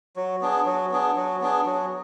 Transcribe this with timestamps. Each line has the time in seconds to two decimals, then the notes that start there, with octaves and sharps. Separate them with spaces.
0.16 F#3
0.41 B3 D4 G#4
0.66 F#3
0.91 B3 D4 G#4
1.16 F#3
1.41 B3 D4 G#4
1.66 F#3